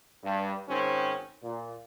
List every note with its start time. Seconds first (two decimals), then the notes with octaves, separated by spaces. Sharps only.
0.24 G2
0.68 G#1 G#2 D#3 C4 C#4
1.43 A#2